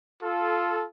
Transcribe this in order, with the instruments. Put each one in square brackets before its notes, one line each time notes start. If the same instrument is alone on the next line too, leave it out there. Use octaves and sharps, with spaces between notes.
[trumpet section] F4 A4